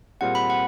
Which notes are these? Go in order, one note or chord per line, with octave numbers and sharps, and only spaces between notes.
A#2 G3 C4 F4 G#4 F#5
B5
F#5